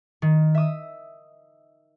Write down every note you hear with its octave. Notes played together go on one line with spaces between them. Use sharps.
D#3
E5 D#6